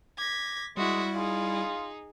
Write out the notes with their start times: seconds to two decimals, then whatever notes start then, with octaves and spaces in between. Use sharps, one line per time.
0.18 D6 G#6 A#6 B6
0.77 G3 G#3 E4 F#4 E5
1.14 D#4 F4 G#4